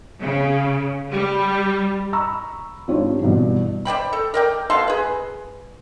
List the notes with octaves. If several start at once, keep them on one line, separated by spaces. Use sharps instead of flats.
C#3
G3
A#5 B5 C#6 E6
G#1 C4 D4 F4 G4 C#5
G2 B2 E3
C5 D5 G5 B5
A4
A#4 D5 G5
B2 A4 F5 C6
G#4 B4